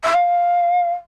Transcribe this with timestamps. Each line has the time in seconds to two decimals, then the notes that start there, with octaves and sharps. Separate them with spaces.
0.04 E5
0.14 F5